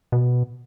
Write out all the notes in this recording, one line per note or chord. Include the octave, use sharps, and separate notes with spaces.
B2